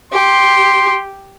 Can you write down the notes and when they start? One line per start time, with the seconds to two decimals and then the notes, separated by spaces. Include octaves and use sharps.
0.12 G4 C6